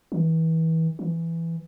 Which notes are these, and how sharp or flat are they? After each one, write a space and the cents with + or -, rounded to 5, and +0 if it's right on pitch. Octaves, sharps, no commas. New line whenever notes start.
E3 -30
E3 +10